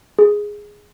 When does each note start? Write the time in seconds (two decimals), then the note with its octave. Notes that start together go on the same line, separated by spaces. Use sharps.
0.19 G#4